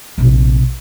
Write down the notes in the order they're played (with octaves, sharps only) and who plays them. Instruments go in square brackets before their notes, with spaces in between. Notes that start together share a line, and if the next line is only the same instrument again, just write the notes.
[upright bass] A#1 C3